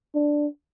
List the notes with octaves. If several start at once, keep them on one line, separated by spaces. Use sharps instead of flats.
D4